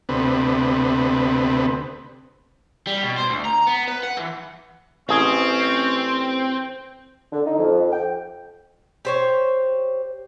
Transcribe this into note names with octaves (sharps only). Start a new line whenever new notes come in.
D2 C3 B3
G3
B2
C5
D2
A#5
B3
B4
F#5
E3
A1 C4 C#4 G#4
D3
D#4
F2
G5
G4 C5 C#5